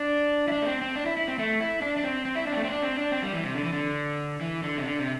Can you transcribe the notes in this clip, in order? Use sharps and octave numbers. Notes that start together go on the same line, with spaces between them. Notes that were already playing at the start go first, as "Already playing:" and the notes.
Already playing: D4
E4
D4
A3
C4
C4
D4
E4
E4
C4
A3
E4
D4
D4
C4
C4
E4
D4
C4
A3
C4
D4
C4
D4
C4
G3
E3
C3
D3
E3
D3
E3
D3
C3
D3
C3